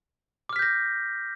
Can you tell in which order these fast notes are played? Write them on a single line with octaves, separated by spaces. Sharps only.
D6 F6 B6 G6 A#6